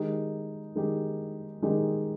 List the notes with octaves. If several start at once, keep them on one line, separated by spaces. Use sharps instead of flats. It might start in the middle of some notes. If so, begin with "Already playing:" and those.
Already playing: D#3 G#3 D#4 G4
D#3 G#3 D#4 G4
D#3 G#3 D#4 G4